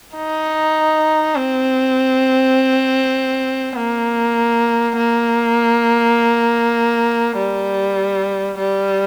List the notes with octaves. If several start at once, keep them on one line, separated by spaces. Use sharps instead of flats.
D#4
C4
A#3
A#3
G3
G3